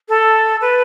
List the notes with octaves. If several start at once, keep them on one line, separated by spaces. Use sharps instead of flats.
A4
B4